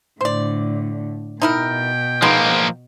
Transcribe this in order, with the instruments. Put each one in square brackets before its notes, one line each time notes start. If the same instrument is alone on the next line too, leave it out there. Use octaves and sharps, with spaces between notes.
[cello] A2 D3 [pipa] C5 D5
[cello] B2 [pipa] D#4 E4 A#4 [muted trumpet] G5
[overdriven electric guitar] F3 A#3 [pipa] G#3 B3 D#4